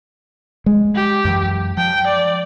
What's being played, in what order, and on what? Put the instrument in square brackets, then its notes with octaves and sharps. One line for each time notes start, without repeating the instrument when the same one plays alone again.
[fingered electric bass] G#3
[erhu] G4
[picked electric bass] F#2 E3 F#3
[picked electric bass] F3 [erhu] G5
[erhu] D5